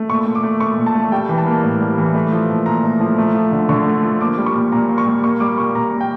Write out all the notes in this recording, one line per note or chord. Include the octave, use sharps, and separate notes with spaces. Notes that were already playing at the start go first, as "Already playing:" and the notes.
Already playing: A3
A#2 C#6
A3
D6
A3
A#2 C#6
A#2
A5
A3
G3 G5
E3
A5
A#3
A2
G3
E3
A3
F3
A#2
A#2 A#5
A3
F3
A3
F3
D3
D3 C#6
A3
F3
A#3 D6
G3
C#6
A#2
A#2 A#5
A#3
C#6
G3
A#3 C#6
G3 D6
A#2 C#6
A#2 A#5
A#3
G5